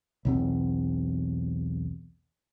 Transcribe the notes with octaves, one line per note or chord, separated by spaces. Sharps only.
B1 E2 C4